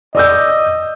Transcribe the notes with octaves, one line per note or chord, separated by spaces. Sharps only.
D5 D#5 E6 G6